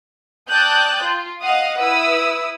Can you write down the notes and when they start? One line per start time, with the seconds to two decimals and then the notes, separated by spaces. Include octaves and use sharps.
0.48 D5 G5 A5 D#6 F#6 G6
1.03 F4
1.41 D#5 F5 F#5 D#6
1.79 E4 B4 D#6 E6